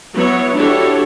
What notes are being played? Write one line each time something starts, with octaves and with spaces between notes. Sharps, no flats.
F#3 B3 E4 C#5
D4 E4 F#4 G4 A4 C#5